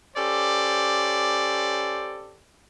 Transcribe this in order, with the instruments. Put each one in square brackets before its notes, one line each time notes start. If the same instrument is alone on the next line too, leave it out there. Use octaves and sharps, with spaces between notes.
[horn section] C#4 G4 A4 C5 D5